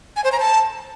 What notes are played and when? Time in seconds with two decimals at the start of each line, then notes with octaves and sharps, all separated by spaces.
0.16 G#5
0.24 C5
0.32 A#5
0.40 A5